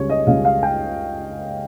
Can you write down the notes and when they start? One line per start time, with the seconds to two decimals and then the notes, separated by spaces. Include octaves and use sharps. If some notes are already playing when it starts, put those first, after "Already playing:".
Already playing: C#2 C#3 G3 C#4 C#5
0.09 D#5
0.27 C#2 C#3 G3 C#4 F5
0.45 F5
0.63 G5